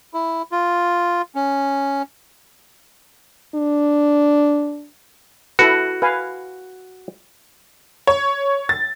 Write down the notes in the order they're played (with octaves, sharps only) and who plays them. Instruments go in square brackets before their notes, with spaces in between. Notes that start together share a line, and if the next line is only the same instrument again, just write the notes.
[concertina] E4
F4
C#4
[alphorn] D4
[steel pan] E4 A4 B4 [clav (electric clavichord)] F#4
[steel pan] B4 F5 G#5
[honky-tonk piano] C#5
A6